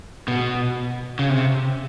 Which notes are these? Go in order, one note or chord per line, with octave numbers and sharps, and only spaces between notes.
B2
C#3
C3